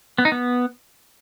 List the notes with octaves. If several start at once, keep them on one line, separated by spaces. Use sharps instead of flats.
B3
D#4
B3